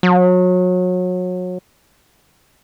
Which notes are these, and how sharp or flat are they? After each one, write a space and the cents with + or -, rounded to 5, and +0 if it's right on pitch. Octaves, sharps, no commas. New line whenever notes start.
F#3 -30